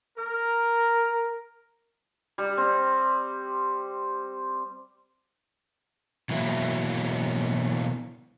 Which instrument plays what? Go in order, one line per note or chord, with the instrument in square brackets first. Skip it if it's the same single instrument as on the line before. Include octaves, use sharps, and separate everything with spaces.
[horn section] A#4
[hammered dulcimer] G3
C4
[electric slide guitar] B2 E3 F#3 A#3 E4